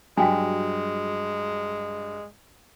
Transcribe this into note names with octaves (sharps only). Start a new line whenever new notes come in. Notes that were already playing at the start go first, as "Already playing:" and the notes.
G2 F#3 G#3 F#4 G5 G#5